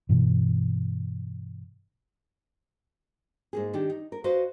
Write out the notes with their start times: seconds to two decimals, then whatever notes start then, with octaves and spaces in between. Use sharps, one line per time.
0.09 G2 B2 E3
3.53 G#2 A#3 G#4
3.73 D#3 D4 G4
3.90 D#4
4.12 A#4
4.24 F#4 B4 C5 D#5 F5